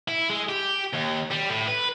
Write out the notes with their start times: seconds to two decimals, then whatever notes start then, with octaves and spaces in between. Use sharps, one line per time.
0.09 E4
0.30 G#3
0.49 G4
0.93 D#2
1.31 G3
1.50 A2
1.68 B4